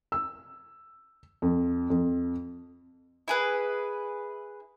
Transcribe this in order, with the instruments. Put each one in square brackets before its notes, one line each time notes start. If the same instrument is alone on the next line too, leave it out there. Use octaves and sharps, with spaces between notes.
[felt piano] E6
F2
F2
[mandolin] E4 G#4 B4